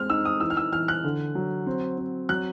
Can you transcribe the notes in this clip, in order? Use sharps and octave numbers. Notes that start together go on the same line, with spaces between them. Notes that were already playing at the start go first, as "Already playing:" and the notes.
Already playing: G#3 C4 F6
D#4 E6
D#6
E3 E6
F6
E6
E3 F6
F#6
D3
F#3
C4
C4
F#3 F#6